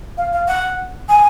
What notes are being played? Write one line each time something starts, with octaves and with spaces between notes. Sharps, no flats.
F5
F5
F#5
G#5